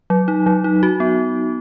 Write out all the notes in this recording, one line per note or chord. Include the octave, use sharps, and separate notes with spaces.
F#3
D#4
F#3
D#4
F#4
B3